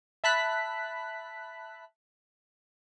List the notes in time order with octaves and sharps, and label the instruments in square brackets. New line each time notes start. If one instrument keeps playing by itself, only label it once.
[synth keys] E5 A5 B5 F#6 B6